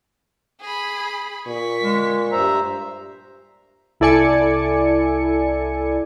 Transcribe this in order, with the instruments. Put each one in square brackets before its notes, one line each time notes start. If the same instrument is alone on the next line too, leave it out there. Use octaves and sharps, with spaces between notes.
[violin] G#4 B5
[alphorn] A#2 [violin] C#6 B6
[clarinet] G#3
[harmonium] G2 E5 A#5 [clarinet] C5
[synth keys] C2 E4 A4 D5 G#5 C#7